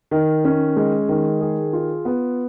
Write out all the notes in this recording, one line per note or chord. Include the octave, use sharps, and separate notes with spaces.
D#3
C#4
G#3
D#3
G#4
F4
B3